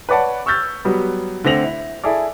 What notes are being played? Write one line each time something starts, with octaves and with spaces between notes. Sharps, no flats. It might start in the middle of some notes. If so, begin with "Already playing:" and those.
B4 C#5 D5 F#5 A5
C#6 E6 F6 G6 A6
F#3 G3 B3
D3 A3 C4 A#6 F7 F#7
E4 E5
E4 G#4 A4 D5